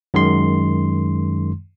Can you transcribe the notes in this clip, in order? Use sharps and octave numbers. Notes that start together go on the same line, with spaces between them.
F#2 D#3 G#3 C6